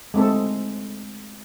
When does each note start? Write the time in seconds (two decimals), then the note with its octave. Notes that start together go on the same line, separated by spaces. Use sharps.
0.14 G#3 A3 C4 A4